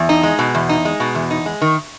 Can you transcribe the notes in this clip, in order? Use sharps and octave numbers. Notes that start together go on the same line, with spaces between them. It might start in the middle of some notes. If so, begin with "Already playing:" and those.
Already playing: E2
D#4
G#3
B2
E2
D#4
G#3
B2
E2
D#4
G#3
D#3